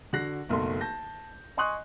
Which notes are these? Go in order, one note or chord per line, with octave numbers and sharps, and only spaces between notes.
D3 F#4 F#6 A#6 C7
F#1 B1 A3 C6
A5 G6 A#6
D#5 G#5 C6 C#6 D#6 F#6